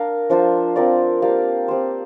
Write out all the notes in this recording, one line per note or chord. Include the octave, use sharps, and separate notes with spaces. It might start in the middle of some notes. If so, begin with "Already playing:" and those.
Already playing: D4 A#4 F5
F3 D4 F4 C5
F3 C4 A#4 D5
A#3 G4 D5 F5
C4 G4 C5